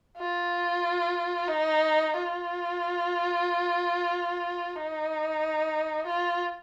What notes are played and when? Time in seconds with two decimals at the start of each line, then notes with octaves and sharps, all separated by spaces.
0.18 F4
1.48 D#4
2.14 F4
4.75 D#4
6.06 F4